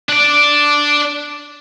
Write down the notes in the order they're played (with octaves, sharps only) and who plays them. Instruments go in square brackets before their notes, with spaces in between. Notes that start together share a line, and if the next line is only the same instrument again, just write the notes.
[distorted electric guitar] D4 D5